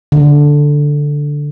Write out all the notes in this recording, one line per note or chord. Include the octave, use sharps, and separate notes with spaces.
D3